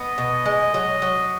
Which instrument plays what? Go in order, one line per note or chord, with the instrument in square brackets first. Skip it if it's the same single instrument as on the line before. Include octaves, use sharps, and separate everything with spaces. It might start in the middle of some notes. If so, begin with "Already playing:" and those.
Already playing: [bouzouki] B3 [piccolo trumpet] D#5
[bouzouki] B2
G#3
F#3
F#3